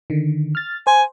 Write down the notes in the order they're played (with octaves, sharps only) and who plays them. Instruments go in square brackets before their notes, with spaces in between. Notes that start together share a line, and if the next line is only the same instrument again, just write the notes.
[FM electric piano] D3 D#3
F6 A6
[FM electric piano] C5 [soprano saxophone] G#5